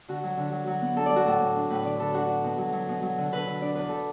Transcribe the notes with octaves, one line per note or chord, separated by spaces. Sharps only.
D3 F#4
F#3
D3
F#3
F#3
B3
D4 A4
D5
F#3 F#4
A2 A4
A2
D4
A2 B4
D3 D5
D3 A4
D4 F#4
D4
B2
F#3
F#3
B2
F#3
D3
D3 B4
D3
D4 D5
E2 B4
A4